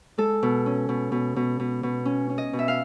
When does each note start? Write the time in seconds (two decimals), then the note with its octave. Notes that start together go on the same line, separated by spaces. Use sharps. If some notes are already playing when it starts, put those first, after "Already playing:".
0.18 G#3 A4
0.43 B2
0.66 C#4
0.89 B2
1.12 B2
1.36 B2
1.60 B2
1.83 B2
2.05 C#4
2.30 C#4
2.38 D#5
2.53 B2
2.59 E5
2.68 F5